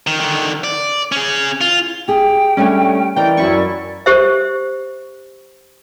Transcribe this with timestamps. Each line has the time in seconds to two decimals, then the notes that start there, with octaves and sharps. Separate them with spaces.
0.07 D#3
0.20 D3 D#3
0.64 D5
1.12 C#4 G#4
1.61 F4
2.08 G4 G#4 G5
2.57 G3 A3 C#4 D4
3.16 E3 A#4 D5 D#5 G5
3.37 F#2 C#4 E4 C#6
4.06 G4 C5 E5